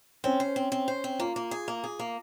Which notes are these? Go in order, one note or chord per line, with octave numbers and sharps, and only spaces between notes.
C4 C#4
C5
C4
C4
C5
C4
A#3 F4
A#3
G#4
A#3
G#4
A#3